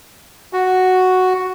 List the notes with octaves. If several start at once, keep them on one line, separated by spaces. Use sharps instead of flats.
F#4